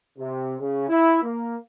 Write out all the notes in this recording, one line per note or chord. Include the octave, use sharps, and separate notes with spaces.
C3
C#3
E4
A#3